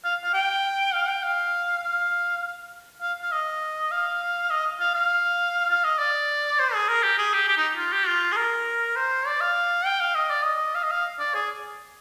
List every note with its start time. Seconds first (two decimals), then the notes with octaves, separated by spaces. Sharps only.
0.04 F5
0.24 F5
0.34 G5
0.94 F5
1.09 G5
1.23 F5
1.83 F5
3.02 F5
3.22 F5
3.32 D#5
3.91 F5
4.50 D#5
4.80 F5
4.95 F5
5.70 F5
5.84 D#5
5.99 D5
6.59 C5
6.74 G#4
6.89 A#4
7.03 G4
7.18 G#4
7.33 G4
7.48 G4
7.57 D#4
7.77 F4
7.92 G4
8.07 F4
8.32 G#4
8.37 A#4
8.96 C5
9.27 D5
9.41 F5
9.85 G5
10.00 F5
10.15 D#5
10.30 D5
10.45 D#5
10.75 F5
10.83 D#5
10.91 F5
11.19 D5
11.34 G#4